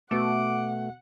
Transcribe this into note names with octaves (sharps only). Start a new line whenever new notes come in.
B2 A3 B3 F#4 F#5 D6